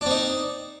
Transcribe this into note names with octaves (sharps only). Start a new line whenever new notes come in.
C4 D4 D#4